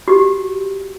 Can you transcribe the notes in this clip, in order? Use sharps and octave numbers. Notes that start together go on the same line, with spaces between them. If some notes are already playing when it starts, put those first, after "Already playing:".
F#4 G4